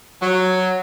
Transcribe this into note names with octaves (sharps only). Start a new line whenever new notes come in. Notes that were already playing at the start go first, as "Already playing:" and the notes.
F#3